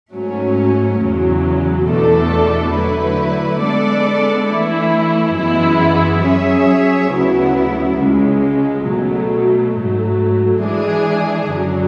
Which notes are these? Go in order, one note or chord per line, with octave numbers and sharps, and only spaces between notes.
G#2 F#3 A3 C#4
E2 C#3 F#3
E2 B2 A3 D4 A4
D3 F#3 A3 E4 B4
G#3 B3 D4 A4 D5
E3 A3 E4
F#2 E3 G#3 B3 E4
F#3 C#4 G#4 C#5 E5
D2 C#3 F#3 B3 E4
C#2 C#3 G#3
B2 F#3 A3
G#2 F#3 A3
E3 G#3 D4 G#4
F#2 D3 F#3